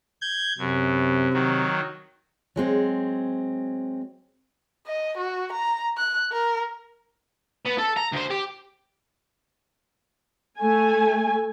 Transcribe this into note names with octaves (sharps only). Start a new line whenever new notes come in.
G6 G#6
F#2 C3
D#3 F#3
F#3 G#3 C4
D#5
F#4
A#5
F#6
A#4
B3
A4
A#5
D2 C5
G4
A3 G#5